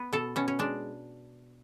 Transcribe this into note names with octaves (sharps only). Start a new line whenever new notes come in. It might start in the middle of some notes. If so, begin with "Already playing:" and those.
Already playing: B3
B2 A4
B2 C#4
C#4
G#3 D4